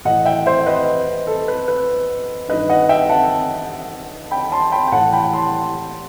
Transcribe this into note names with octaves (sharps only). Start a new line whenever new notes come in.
A2 E3 D#5 F#5
E5 G5
C5 E5
B4 D#5
A4
B4
B4
G2 D#3 B4 D#5
D#5 F#5
E5 G5
F#5 A5
G5 B5
A5 C6
G5 B5
G5
A2 E3 F#5 A5
G5 B5
A5 C6